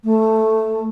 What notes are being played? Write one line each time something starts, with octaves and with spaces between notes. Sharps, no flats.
A3